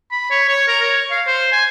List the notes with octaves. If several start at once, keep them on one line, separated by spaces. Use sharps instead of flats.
B5
C#5
C#5
A#4
C#5
F5
C5
G#5